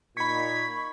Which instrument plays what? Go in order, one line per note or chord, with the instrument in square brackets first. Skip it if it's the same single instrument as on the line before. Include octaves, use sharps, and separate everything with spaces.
[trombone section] A#2 D#4 [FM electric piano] B5 C#6 [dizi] G#6 [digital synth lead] B6